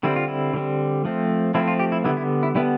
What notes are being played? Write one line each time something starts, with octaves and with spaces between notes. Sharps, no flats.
D3 G3 C4 E4
F4
E4
D3 G3 C4
F3 A3 C4
F3 A3 C4 E4
F4
G4
E4
D3 G3 B3 E4
E4
E4
D3 G3 B3 E4